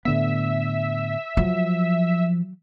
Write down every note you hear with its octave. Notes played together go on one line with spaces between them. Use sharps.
A2 D3 B3 E5
F3 F#3